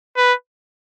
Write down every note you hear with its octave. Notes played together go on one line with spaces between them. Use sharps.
B4